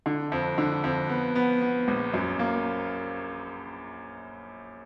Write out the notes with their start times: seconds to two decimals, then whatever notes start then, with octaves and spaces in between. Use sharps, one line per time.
0.06 D3
0.32 F2
0.58 D3
0.84 F2
1.09 B3
1.35 B3
1.62 B3
1.88 A#1
2.14 F#2
2.39 A#3